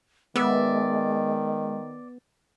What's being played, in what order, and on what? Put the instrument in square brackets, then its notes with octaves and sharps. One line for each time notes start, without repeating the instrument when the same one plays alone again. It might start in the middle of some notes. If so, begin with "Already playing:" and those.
[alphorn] D#3 [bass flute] G#3 [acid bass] B3 [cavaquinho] D5 E5